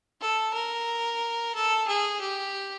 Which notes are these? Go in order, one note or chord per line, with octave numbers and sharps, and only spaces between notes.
A4
A#4
A4
G#4
G4